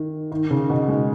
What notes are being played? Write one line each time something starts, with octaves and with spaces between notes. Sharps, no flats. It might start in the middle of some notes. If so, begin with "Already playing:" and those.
Already playing: D#3
D#3
C#3
B2
G#3